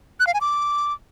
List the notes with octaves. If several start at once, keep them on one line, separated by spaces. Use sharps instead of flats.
F#6
F5
G#5
D6